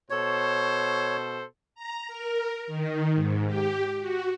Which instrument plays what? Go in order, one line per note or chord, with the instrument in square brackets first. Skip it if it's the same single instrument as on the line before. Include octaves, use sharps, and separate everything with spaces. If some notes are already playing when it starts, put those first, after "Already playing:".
[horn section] B2 A4 C5 [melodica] C#5
[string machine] A#5
A#4
D#3
G#2
G4
F#4